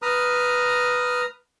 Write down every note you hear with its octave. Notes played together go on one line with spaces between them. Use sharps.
B4 A#5 D#6 F6